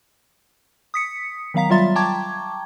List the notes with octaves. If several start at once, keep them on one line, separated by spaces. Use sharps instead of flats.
D#6 B6 C#7
D#3 F#3 B3 F5 A#5 B6
F#3 G3 F4 E5 C6 A6
G5 A5 A#5 C#6 D6 G#6